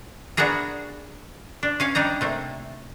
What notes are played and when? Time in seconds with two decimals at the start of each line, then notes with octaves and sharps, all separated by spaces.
0.37 B3 D4 F#4 G#4 A#4
1.63 D4
1.80 C#4 F5 G#5
1.95 G3 D4 D#4 A#5
2.21 C3 A3 A#3